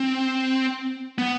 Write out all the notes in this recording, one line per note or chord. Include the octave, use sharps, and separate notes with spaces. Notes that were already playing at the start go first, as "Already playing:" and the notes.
Already playing: C4
B3